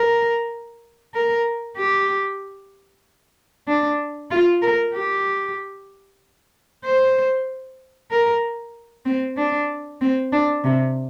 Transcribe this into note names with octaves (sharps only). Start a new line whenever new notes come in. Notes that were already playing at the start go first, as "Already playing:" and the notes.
Already playing: A#4
A#4
G4
D4
F4
A#4
G4
C5
A#4
C4
D4
C4
D4
C3